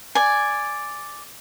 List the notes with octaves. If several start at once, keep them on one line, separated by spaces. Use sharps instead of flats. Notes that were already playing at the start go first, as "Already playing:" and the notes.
D5 G#5